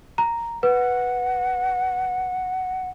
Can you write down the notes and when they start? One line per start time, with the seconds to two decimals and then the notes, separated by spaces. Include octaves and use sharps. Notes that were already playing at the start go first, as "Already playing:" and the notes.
0.18 A#5
0.63 B4 F#5